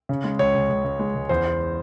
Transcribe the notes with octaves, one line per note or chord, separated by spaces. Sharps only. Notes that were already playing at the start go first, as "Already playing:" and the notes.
C#3
G#3
C#2 C#5
C#2
C#2
C#2
G#3
C#2
E2 C5
E2